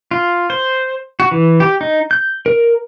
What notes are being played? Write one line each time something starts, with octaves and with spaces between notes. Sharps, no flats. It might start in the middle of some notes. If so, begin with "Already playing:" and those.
F4
C5
F#4
E3
G4
D#4
G6
A#4